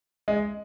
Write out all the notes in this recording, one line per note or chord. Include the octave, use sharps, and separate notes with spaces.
G#3